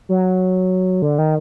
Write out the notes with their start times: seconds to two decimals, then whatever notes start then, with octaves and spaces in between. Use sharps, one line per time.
0.09 F#3
1.02 D3
1.18 D#3